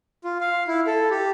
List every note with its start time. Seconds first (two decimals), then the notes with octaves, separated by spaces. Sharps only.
0.24 F4
0.41 F5
0.68 E4
0.87 A4
1.11 G4